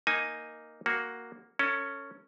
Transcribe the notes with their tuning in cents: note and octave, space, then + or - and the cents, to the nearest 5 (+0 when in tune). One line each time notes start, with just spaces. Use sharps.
A#3 +0 D#4 +0 G#5 +0
A#3 +0 F#4 +0
C#4 +0 A4 +35